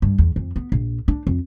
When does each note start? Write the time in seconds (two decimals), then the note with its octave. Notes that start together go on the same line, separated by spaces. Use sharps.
0.02 G2
0.18 E2
0.36 F2
0.56 B3
0.72 A#1
1.08 D4
1.27 F2